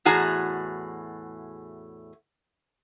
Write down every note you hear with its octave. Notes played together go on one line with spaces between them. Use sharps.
E2 A2 F#4 G#4 A#5